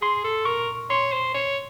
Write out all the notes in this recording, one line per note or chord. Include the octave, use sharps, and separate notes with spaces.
G#4 C6
A4
A#4 C#6
C#5 C6
C5
C#5